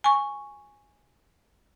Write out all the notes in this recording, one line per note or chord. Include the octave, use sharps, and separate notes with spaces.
G#5 C#6